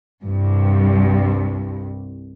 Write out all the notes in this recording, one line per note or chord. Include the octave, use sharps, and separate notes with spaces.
C2 G2